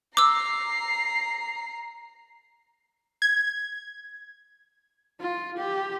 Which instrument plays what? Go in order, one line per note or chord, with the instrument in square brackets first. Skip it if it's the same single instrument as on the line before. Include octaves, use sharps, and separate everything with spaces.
[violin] A#5 C7 [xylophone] D6 E6
[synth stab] G#6
[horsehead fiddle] F4
G4